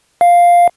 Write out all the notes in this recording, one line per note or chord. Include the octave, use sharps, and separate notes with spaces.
F5